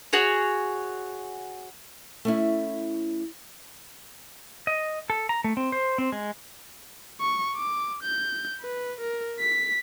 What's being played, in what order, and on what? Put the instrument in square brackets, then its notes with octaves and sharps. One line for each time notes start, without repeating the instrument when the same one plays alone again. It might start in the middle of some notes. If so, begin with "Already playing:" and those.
[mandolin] F#4 G#4 C#5
[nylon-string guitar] A3 C#4 E4
[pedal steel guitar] D#5
A4
A#5
A3
C4
C5
C4
G#3
[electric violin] C#6
D6
G6
B4
A#4
B6